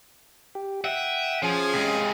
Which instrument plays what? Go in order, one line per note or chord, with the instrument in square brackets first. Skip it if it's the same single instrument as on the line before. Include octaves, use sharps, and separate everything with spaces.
[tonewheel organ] G4
[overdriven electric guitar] E5 [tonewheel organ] F#5 G5 D#6
[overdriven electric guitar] F3 [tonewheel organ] C#4 [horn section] G#4 F5 G#5
[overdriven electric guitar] C3 G#3